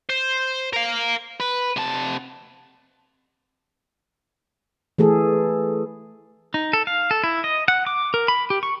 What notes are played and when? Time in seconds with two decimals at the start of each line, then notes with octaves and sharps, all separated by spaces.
0.10 C5
0.73 A#4 F5
1.40 B4
1.77 C3 A5
4.98 E3 A3 G#4 A4
6.54 D#4
6.73 A4
6.87 F5
7.11 A4
7.24 E4
7.44 D#5
7.68 F#5
7.87 D6
8.14 A#4
8.28 B5
8.50 G4
8.63 C#6